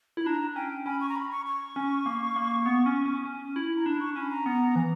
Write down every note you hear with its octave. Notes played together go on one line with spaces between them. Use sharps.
E4 B5
D4 A#5
C#4 G5
C#4 B5
C#6
A#5
B5
C#6
C#6
C#4
A#3
A#3
B3
C#4
C#4
C#4
E4
A#5
D4 B5
C#6
C#4 B5
A#5
B3
E3